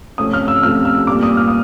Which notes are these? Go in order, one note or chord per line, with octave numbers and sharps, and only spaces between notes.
C3 F3 A3 C#4 D#6
F6
E6
C3 F3 A3 C#4 F6
E6
A#2 G3 B3 D6
D#6
F6
D#6